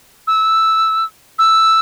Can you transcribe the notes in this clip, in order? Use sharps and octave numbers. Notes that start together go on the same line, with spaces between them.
E6
E6